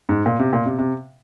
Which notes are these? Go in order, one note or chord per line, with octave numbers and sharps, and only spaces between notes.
G#2
A#2
C3
A#2
C3
C3